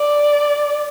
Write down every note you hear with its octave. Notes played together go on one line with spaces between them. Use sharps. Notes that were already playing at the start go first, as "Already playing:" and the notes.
Already playing: D5